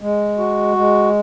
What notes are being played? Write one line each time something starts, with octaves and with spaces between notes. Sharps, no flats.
G#3
F#4
G#3